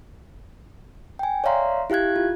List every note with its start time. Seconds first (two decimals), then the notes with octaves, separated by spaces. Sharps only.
1.19 G5 G#5
1.44 C#5 D5 E5 F5 A#5 C6
1.90 E4 G4 F5 F#6 G#6
2.16 F4